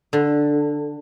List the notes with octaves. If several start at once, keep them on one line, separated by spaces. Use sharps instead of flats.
D3